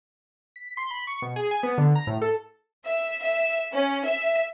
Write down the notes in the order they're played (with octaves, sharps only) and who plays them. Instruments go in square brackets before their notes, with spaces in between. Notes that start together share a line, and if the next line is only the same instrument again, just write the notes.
[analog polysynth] B6
C6
B5
C#6
B2
G#4
G#5
B3
D3
A#5
A2
A4
[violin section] E5
E5
C#4
E5